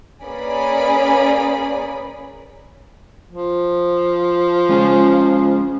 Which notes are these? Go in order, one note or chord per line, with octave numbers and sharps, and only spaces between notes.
A#3 C#4 G#4 B4 D5 B5
F3
G#3 C#4 G#4